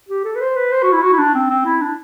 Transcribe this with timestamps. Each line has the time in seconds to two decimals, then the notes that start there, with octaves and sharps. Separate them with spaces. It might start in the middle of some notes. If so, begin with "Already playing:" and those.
0.09 G4
0.25 A4
0.36 B4
0.41 C5
0.56 B4
0.72 C5
0.82 F#4
0.93 E4
1.03 F#4
1.13 E4
1.18 D4
1.35 C4
1.50 C4
1.66 E4
1.81 D4